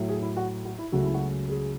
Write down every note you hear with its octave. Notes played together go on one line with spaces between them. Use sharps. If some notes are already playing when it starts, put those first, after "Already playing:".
Already playing: A2 F#3 A3
G#4
E4
F#4
F#4
E4
C#2 C#3 F#3 A3 F#4
E4
F#4
G#4